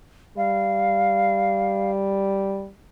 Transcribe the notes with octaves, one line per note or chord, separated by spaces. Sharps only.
G3 F5